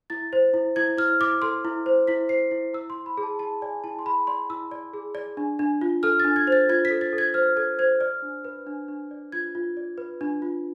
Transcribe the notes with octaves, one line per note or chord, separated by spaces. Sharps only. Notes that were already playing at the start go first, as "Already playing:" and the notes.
E4 A6
C5
E4
E4 G#6
E4 F6
E4 D6
A4 C6
E4
C5
E4 B6
C5 C7
E4
E4 E6
C6
E4
B5
G#4
A5
E4 A5
D5 G#5
E4 A5
C6
G#4 B5
D5 C6
E4 E6
D5
G#4
D5
D4
D4
F4
A4 F6
A6
D4
G#6
C5 A6
F4 G#6
B6
A4
A6
A4
G#6
C5 F6
A4 G#6
C5 G#6
D5 F6
D4
B4
D4
D4
D5
F4 G#6
F4
D5
B4
D4
F4